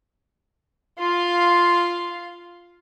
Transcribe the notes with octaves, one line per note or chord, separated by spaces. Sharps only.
F4 F5